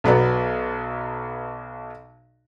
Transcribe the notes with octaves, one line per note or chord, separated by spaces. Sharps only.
B1 F#3 B3 D5